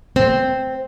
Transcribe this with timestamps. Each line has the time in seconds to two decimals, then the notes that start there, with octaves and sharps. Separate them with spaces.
0.16 C4